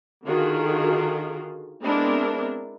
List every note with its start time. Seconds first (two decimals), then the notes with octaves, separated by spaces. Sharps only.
0.25 D3 D#3 F4 F#4 G#4
1.83 G#3 B3 C4 D4 E4 A#4